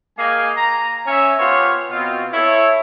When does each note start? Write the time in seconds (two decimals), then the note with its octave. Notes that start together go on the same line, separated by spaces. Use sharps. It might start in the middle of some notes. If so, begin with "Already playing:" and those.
0.19 G#3 A#3 D#5 F5 G5 G#5
0.57 A#5
1.07 C#4 E5 G#5
1.39 B3 F4 G4 C5 C#5
1.91 B2 C4 F4
2.33 E4 A4 C#5